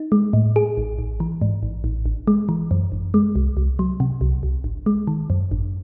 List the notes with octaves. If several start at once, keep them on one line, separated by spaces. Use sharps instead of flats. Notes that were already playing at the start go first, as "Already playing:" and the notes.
Already playing: D#4
G#3
A2
G#4
A1
A1
E3
G#2
A1
A1
G#1
G#3
E3
F#2
G#1
G#3
C2
C2
F#3
C3
C2
C2
G#1
G#3
D#3
F#2
G#1